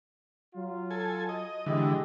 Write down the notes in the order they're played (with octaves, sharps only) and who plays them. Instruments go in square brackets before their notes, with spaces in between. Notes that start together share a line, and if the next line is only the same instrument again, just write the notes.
[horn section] F#3 F4
[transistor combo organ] A4 G#5
D#5
[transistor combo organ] D3 E3 [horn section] G#3 G4 D#5